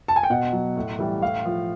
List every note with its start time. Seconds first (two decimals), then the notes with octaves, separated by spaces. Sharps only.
0.08 A5
0.16 G#5
0.23 G5
0.30 B2 F#5
0.53 F#3
0.76 A2
0.99 E3 G3
1.22 A2 F5
1.46 F3